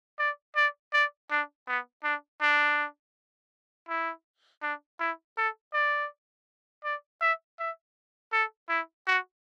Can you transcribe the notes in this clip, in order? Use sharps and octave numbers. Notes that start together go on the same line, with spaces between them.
D5
D5
D5
D4
B3
D4
D4
E4
D4
E4
A4
D5
D5
E5
E5
A4
E4
F#4